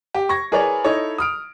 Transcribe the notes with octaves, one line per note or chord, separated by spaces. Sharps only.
G4
C#6 G#6 A#6
E4 G#4 A#4 B4 C#5 D5
D#4 E4 A4 C#5 D#5
D#6 F6 D7